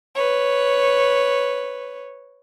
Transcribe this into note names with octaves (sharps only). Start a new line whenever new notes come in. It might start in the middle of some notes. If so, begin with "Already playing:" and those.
B4 C#5